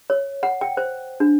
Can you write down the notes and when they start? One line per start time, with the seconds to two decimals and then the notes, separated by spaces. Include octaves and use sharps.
0.10 C#5
0.43 F#5
0.61 G5
0.77 C5
1.20 D4